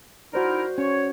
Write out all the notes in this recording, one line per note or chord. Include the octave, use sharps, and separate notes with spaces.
D#4 E4 F#4 A#4 C5 D5
C#4 C#5